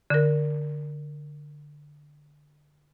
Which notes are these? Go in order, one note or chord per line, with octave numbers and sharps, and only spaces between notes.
D3 A#4